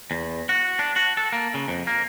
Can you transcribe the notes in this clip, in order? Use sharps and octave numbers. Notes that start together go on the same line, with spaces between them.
E2
F#4
D4
F#4
A4
A#3
C#3
F2
A#3